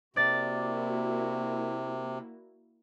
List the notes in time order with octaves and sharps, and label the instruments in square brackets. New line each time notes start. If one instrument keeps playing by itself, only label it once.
[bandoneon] C3 [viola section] A#3 E4 F#4 [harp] D5 A6